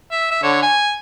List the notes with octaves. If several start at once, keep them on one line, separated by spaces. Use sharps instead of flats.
E5
E5
D3 C#5
G#5